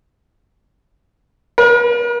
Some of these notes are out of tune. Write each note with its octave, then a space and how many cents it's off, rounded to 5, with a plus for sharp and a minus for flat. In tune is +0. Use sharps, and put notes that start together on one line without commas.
A#4 +45